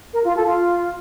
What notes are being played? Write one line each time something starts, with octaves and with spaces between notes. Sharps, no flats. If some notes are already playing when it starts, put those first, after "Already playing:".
A#4
F4
A4
F4